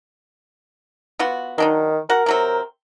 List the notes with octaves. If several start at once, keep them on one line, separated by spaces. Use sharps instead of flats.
B3 F4 F#4
D#3 F#3 D4 D#4
F#4 A#4 F#5
C3 F#3 C4